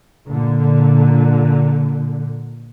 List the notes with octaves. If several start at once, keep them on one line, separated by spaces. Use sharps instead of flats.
A#2 D3